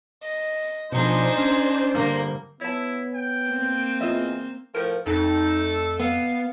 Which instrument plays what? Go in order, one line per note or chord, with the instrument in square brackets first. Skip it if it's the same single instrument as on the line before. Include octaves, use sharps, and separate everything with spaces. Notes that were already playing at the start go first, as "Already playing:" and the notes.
[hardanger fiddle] D#5
[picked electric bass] B2 F3 [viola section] D4 C5 [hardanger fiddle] D#4 G#4
[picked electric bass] C#4
[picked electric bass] G2 D3 [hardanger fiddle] A#3
[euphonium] B3 [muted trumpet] E4 [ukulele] C#5 A5
[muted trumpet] G5
[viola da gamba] A#3 C4
[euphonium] E2 [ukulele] F4 D#5 E5
[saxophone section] A2 F3 [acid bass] A#4
[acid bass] F2 [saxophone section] A3 A4 [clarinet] D#4
[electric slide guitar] B3 [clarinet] F5